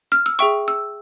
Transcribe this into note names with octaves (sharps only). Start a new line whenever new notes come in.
F6
E6
G#4 E5 G5 C#6
E6